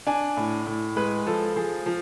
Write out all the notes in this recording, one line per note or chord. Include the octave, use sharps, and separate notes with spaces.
D4 G#5
A2
A2
G#3 B4
F3 A4
F3 G#4
F3